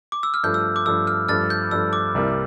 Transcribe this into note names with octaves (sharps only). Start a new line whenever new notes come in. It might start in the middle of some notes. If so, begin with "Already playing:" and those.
D6
E6
F6
G2 F3 A3 G6
E6
D6
G2 F3 A3 E6
F6
G2 F3 A3 F6 A6
G6
G2 F3 A3 E6
D6
C2 C3 G3 A#3 E4